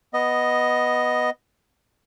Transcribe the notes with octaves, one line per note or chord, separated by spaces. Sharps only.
B3 D#5